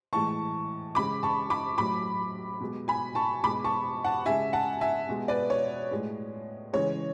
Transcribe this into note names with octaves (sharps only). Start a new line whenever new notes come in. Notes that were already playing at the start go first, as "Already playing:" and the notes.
A2 E3 G#3 A5 C#6
C#3 G#3 B5 D6
A5 C#6
B5 D6
A2 F#3 B5 D6
B2 G#3
G#5 B5
A5 C#6
B2 G#3 B5 D6
A5 C#6
F#5 A5
C#3 G#3 E5 G#5
F#5 A5
E5 G#5
B2 G#3
B4 D5
C#5
A2 G#3
C#3 E3 G#3 C#5